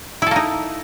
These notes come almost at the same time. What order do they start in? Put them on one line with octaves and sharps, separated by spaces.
E4 A4 A#3 D#4